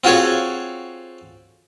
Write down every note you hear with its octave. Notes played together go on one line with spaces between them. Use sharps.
C4 F4 F#4 G#4 A4 C#5